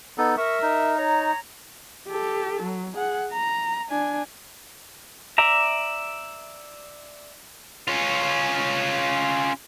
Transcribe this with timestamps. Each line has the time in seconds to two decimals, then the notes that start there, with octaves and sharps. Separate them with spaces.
0.18 B3 D#4 A4
0.37 A#4 E5 C#6
0.62 D#4
0.98 C#5 A#5
2.08 G4 A4
2.62 F#3
2.93 G#4 F#5
3.32 A#5
3.89 D4 G#5
5.38 D5 E5 A#5
7.88 C#4 F4